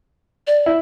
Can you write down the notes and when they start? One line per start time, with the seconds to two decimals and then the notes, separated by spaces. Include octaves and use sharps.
0.47 D5
0.66 E4